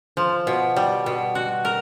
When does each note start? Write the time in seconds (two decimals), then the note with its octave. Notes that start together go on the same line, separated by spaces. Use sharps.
0.17 F3
0.47 B2
0.76 G3
1.06 B2
1.35 F#4
1.65 A#4